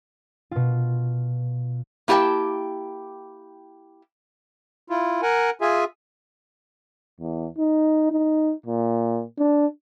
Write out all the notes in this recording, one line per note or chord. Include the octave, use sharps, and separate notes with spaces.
B2 F4
A#3 E4 G4 D#5 G5 A5
E4 F4
A#4 F#5 G#5
F4 G#4 E5 G#5
E2
D#4
D#4
A#2
D4